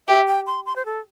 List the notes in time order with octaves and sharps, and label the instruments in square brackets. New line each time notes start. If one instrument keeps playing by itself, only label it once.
[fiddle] G4 [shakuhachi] E5
[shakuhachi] G5
C6
C6
C5
A4